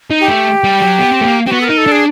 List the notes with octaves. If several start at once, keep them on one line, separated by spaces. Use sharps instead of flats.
D#4
G4
A3
G3
F#3
B3
C4
A3
A#3
C4 G4
B3 F#4
A4
D#4 A#4
A4
D4
G#4